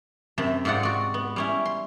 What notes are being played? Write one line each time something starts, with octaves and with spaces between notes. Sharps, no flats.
F#2 C3 A5 B5
G#2 C4 F4 D5 F#5
F#4 D5
B3
G3 C#4 E4
C6